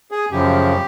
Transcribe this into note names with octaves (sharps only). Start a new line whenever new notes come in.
G#4
F#2 C#3 F3 G4